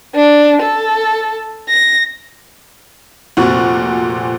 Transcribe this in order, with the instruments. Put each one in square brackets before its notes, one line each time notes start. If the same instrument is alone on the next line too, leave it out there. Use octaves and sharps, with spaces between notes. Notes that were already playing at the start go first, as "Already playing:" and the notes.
[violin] D4
A4
A#6
[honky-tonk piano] F1 A#2 C4 F#4 C#6